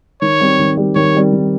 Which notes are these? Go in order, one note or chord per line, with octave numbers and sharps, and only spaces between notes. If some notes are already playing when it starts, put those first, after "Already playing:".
D#3 C#5
G3 C4 G4
D#3
G3 C4 G4
D#3 C#5
G3 C4 G4
D#3